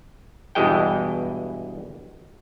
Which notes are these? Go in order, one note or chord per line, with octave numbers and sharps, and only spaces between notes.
E2 G2 B2 E3 G#3 G5